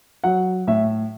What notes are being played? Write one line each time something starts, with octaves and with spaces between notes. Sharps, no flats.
F#3 F#5
A2 E5